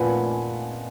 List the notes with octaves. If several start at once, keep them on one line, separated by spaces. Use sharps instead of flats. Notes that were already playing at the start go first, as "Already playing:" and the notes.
Already playing: A#2 F3 A#3 B4 F#5 G#5